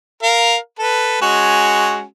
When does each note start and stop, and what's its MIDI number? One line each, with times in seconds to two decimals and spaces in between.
0.23 0.56 70
0.23 0.56 77
0.79 1.18 69
0.79 1.18 71
1.21 2.04 56
1.21 2.04 61
1.21 2.04 66